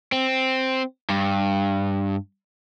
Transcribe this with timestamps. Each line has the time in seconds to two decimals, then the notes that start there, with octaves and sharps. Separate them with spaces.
0.12 C4
1.09 G2